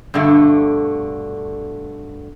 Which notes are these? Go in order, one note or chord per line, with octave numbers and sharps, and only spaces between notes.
G2 B2 D3 A3